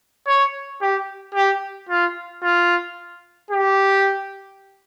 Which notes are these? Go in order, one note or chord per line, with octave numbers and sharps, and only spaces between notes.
C#5
G4
G4
F4
F4
G4